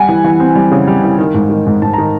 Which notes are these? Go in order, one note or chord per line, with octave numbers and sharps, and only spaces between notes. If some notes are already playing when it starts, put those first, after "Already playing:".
Already playing: G3 F#5 G#5
E3
E3
C4
G3
C#3
G3
E3
D#3
G#2
D#3
G#2
G#2 A5
D#3 A#5